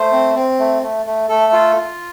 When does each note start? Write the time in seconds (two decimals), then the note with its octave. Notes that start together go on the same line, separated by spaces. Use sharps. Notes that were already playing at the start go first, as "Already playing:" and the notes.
Already playing: A3 C5
0.12 C4
0.35 C4
0.60 A3
0.83 A3
1.06 A3
1.29 A3 A4
1.53 F4
1.76 F4